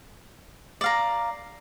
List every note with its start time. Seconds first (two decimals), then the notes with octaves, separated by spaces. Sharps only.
0.81 D5 F5 A#5